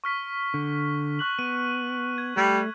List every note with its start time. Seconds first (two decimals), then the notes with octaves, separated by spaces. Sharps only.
0.04 C#6 F6 B6
0.54 D3
1.19 C#6 F#6 F#7
1.39 B3 D#7
2.18 G#6
2.37 G3 A3